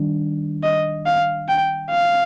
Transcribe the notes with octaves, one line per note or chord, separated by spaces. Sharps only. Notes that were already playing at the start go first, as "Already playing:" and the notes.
Already playing: D#3 G3 D4
D#5
F5
G5
F5